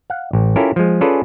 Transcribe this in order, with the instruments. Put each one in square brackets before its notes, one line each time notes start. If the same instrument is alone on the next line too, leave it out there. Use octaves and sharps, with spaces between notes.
[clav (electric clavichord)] F5 F#5
A1
C#4 E4 F4 G4 A4 A#4
F3 G#3
C#4 F4 G#4 A4 B4 D5